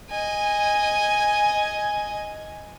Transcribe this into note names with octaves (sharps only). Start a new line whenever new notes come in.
D#5 G#5